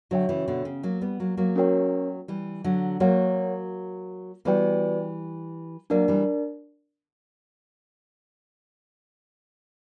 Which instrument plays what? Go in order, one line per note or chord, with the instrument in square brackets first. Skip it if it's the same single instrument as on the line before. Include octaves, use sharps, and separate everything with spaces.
[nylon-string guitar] D3 F#3 [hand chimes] F#4 C#5 E5 G5
[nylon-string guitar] C#3 E3
B2 D3
C#3
F#3 A#3
G3 B3
F#3 A#3
F#3 A#3
[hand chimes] C#4 F#4 A#4 C#5 G5
[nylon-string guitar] E3 G3
D3 F#3
[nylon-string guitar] F#3 A#3 [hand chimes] F#4 A#4 C#5 F#5
[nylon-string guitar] E3 G3 [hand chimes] B3 F#4 B4 D5 G5
[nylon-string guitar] F#3 A#3 [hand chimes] D4 A#4 D5
[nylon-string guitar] E3 G3